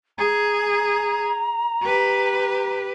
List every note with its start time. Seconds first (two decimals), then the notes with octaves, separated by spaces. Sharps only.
0.18 G#4 A#5
1.82 G4 B4